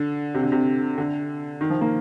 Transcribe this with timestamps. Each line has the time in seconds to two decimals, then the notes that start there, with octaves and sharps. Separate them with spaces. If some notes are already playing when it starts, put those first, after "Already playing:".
Already playing: D3
0.34 C3
0.43 D3
0.52 C3
0.98 D3
1.61 D#3
1.70 F3
1.81 A#3